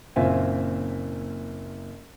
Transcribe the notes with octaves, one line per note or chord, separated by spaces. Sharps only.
F#1 A#2 C4 F4 E5 G#5